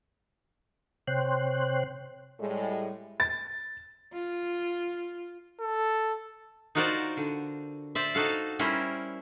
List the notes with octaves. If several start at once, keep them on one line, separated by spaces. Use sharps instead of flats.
C3 C5 C#5 G5 C6 F#6
A2 G3 G#3
A6
F4
A4
D#4 F4 F#4 A#4 C5 D5
D3
C5 D5 E5
D#4 F#4 A4 F5
G3 C#4 E4 A#4 C5